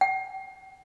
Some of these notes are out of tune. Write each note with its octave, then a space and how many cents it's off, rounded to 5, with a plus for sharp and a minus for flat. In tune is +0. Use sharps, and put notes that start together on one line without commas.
G5 -45